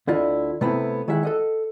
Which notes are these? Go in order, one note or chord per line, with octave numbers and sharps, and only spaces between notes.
D2 D3 E4 F4 D5 D#5
C3 A3 B3 C4 E4
D#3 G#3 E4 G#4 E5 F#5
A4 D#5 F#5